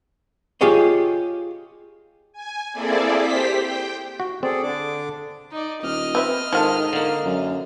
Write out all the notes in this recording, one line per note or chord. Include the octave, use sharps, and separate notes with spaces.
F4 G4 G#4 C#5 D#5
G#5
A#3 C4 E4 G#4 A4 D5
G4 C5 B6
G5
F#4
C4 G#4 A4 D5
D3 D4 D6
D#4 D5
D#1 D#5 F6
C4 B4 E5
G#2 D#3 F3 F4 A4
D3 A#3
F#2